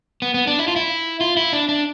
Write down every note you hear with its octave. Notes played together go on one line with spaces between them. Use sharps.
B3
B3
D4
E4
F4
E4
F4
E4
D4
D4